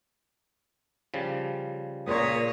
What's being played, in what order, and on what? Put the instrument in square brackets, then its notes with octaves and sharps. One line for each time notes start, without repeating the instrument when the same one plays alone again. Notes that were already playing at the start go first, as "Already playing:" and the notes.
[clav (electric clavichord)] C#3 F3 G3
[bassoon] C#2 [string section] A#2 [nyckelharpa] C#5 D#6